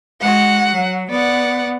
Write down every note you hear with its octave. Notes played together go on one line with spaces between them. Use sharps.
G#3 F#4 F#5
F#3
B3 D5 F#5